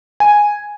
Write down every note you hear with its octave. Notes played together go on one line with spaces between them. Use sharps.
G#5